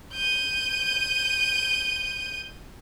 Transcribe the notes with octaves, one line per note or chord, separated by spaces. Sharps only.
G6 D#7